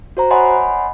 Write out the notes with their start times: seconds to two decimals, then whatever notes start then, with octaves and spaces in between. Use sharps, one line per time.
0.17 F#4 C5 A#5
0.30 C#5 D#5 F#5 G#5 B5 C6